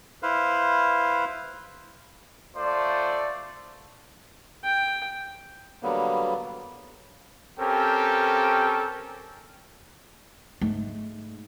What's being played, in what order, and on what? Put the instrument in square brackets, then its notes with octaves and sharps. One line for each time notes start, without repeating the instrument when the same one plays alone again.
[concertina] E4 B4 C5 F5
[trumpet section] A3 F4 C5 D5
[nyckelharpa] G5
[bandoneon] D3 F#3 G3 A#3 B3
[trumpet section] C4 C#4 G4 A4 A#4 G5
[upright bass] G#2 A3